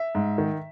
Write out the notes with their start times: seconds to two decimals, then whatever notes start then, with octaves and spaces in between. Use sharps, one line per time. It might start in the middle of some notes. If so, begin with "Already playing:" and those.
Already playing: E5
0.15 G#2
0.38 D#3